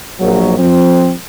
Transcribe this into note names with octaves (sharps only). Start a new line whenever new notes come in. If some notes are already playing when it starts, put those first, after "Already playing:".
A#1 F#3
F3 C4